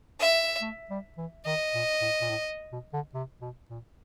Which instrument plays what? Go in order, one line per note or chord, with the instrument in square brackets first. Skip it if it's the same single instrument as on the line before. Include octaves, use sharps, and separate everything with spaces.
[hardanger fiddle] E5
[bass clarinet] A3
G3
E3
[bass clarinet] D#3 [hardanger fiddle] D#5
[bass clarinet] A#2
A2
A#2
A2
B2
D3
C3
B2
A#2